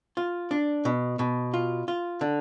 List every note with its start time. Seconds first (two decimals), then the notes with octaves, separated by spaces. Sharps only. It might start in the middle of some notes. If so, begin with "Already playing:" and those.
0.17 F4
0.51 D4
0.85 B2
1.19 B2
1.54 F4
1.88 F4
2.21 D3